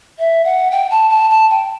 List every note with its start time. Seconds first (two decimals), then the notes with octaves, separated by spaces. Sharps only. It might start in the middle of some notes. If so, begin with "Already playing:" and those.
0.19 E5
0.45 F#5
0.72 G5
0.90 A5
1.10 A5
1.30 A5
1.50 G5